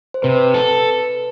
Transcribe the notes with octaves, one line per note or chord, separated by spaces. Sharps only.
C5
C3 B4
A4